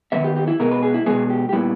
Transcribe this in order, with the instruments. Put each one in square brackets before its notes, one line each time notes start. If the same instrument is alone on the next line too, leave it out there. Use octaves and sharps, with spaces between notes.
[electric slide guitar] D#3 G#3 B3 E5
G4
G4
E4
B2 G#3 B3 A#4
B4
G#4
E4
B2 G#3 B3 G#4
G4
G4
A#2 G3 B3 E4